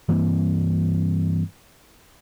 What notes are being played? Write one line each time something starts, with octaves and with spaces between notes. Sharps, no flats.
G2 E3 A#3 C4